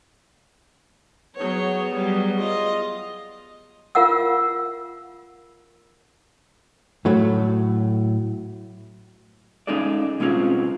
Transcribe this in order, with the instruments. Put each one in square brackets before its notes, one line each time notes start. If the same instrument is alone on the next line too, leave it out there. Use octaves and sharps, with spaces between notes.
[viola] F#3 C#5 [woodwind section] B3 G#4
[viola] F#3 G3
F4 D#5
[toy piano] F4 A#4 F5 F#5 E6
[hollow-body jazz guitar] A2 F#3 A3
G#3 C#4 D#4 G#4 A4 D5
B2 G#3 C4 C#4 F4 G#4